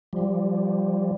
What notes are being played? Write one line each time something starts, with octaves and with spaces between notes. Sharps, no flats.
F3 G3